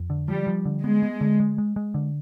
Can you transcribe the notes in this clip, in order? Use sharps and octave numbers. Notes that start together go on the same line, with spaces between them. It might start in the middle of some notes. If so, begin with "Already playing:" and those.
Already playing: F2
D3
F3 G3
F3
D3
G#3 B3
B3
D3
G#3
G#3
G#3
D3